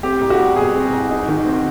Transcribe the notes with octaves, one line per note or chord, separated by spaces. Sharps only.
C4 G4
C2
F#4
G3
B2 G#4
C4
C2
D#4
D#3
C4